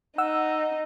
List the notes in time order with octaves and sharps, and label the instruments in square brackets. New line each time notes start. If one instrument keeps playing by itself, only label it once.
[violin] D#4 [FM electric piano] F#5 E6